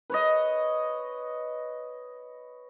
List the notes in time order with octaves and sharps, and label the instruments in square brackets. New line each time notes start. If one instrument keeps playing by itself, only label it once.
[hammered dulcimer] B4 C#5 D#5